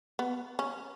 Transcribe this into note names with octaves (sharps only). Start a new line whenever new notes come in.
B3
C#4